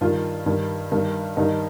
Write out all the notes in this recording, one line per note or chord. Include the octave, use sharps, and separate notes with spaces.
G2 D#3 F4
G2 D#3
G2 D#3
G2 D#3 D#4